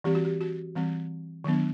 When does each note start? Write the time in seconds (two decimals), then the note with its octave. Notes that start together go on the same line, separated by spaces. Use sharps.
0.04 E3 G3 C4 G4
0.15 F#4
0.25 G4
0.41 F#4
0.75 E3 G3 C4
1.44 D#3 F#3 B3 D4